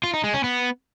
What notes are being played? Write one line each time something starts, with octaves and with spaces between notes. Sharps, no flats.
F4
D#4
G#3
C#4
B3